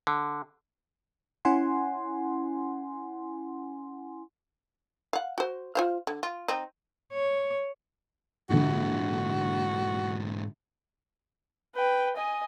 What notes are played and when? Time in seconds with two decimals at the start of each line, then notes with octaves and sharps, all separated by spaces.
0.07 D3
1.45 C#4 E4 F#5 G#5 C6
5.13 F5 F#5
5.38 F#4 C5
5.75 F4 C5 F5
6.07 D3
6.23 F4
6.48 C4 D#4
7.13 C#5
8.50 A#1 G#2 D3 E3 F#4
11.75 B4 G5
12.16 D#5 G#5